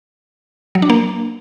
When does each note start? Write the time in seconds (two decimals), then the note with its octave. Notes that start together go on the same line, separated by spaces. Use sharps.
0.75 F#3
0.82 D4
0.90 A#3